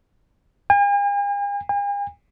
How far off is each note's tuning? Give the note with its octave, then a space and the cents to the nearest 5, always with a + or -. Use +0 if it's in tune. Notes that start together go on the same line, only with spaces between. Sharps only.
G#5 -45
G#5 -45